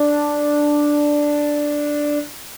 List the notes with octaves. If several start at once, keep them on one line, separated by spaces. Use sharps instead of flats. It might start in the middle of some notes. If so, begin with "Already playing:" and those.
Already playing: D4